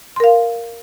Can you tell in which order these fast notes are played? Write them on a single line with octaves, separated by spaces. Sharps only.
C6 A#4 F5